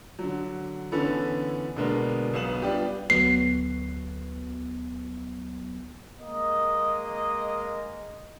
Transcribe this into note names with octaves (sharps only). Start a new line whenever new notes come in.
D3 F#3
D3 E3 B3 C#4 A4 B4
B2 D3 G#3 A#3 B3 D4
B1 B3 F5 D#6 E7 F#7
G3 B3 D4 F4 G4
D2 F#3 B3 C7
G#3 A#3 D#5